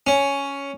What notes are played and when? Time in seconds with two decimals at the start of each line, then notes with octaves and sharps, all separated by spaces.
0.07 C#4